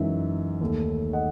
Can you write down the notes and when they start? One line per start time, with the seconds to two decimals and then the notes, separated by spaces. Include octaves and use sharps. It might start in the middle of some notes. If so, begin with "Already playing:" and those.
Already playing: F#2 E3 G#3 D#4 E5
0.61 D#2 D#3 A3
1.13 D#5 F#5